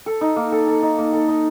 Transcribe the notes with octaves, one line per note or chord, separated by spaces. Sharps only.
A4
D#4
A#3
A4
A4
D#4
A#3
A4
D#4